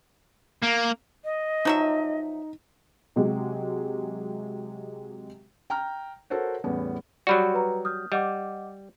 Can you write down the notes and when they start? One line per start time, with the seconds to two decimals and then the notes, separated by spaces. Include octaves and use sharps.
0.63 A#3
1.24 D#5
1.65 F3 F#3 D#4 E5
3.16 C3 F#3 G#3 G4
5.70 G5 A#5 F6
6.30 F#4 A4 A#4 C5 C#5 F#5
6.64 E2 A2 G3 B3 C#4
7.27 F#3 G3 F#4 D5 B5
7.54 B4 A#5
7.85 D#6 F6 G6
8.12 G3 D#5 F#5 D6